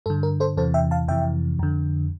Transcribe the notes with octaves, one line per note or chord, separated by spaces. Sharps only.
G2 D3 A4
A#4
A4 C5
E2 C3 E3 A4 C5
E5 G5
F5 A5
F2 C3 E3 E5 G5
F2 D3